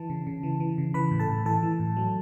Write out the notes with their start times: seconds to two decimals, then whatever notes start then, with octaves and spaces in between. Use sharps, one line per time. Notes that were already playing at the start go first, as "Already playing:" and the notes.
Already playing: E3 A5
0.10 C#3
0.27 C#3
0.43 E3
0.60 E3
0.78 C#3
0.94 E3 B4 B5
1.11 A2
1.19 A4 A5
1.28 A2
1.45 E3 A4 A5
1.63 E3
1.80 A2
1.97 F#3